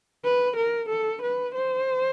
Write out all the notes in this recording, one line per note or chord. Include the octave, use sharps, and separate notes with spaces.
B4
A#4
A4
B4
C5